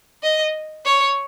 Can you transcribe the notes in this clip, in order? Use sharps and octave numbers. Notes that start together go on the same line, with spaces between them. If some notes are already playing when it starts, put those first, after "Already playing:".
D#5
C#5